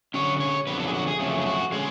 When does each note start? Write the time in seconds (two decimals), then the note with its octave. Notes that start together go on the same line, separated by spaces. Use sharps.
0.14 D3 F#3 C#4 C#5
0.40 C#5
0.67 F2 D3 F#3 B3 B4
0.80 A4
0.87 G#4
0.94 F#4
1.07 G#4
1.19 F2 C#3 F#3 A3 C#4
1.42 G#4
1.46 F#4
1.72 D3 G#3 C#4 G#4